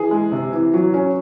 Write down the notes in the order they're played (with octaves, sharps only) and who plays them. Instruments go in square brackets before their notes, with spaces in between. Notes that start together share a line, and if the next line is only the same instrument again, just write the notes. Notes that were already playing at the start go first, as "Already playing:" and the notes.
Already playing: [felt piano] E3 G#4
G#3
C3
E3
F#3
C#4